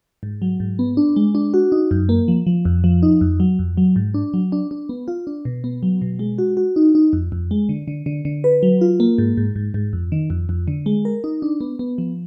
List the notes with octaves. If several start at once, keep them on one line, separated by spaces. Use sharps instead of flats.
G#2
F#3
G#2
B3
D4
G#3
D4
F#4
D#4
F#2
A#3
F3
F3
F2
F3
D#4
F2
F#3
F2
F#3
G#2
D4
F#3
D4
D4
B3
F4
D4
B2
B3
F#3
B2
G#3
F#4
F#4
D#4
D#4
F2
F2
G#3
D3
D3
D3
D3
B4
F#3
F4
A#3
G#2
G#2
G#2
G#2
F2
D#3
F2
F2
D3
G#3
A#4
D#4
D4
B3
B3
F3